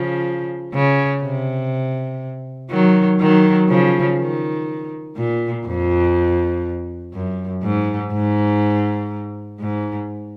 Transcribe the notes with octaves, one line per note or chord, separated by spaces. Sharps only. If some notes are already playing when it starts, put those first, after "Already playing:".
Already playing: C#3 F3
C#3
C3
D#3 F#3
D#3 F#3
C#3 F3
D#3
A#2
F2
F#2
G#2
G#2
G#2